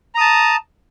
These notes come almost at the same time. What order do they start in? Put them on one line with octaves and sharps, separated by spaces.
A#5 D#6 A5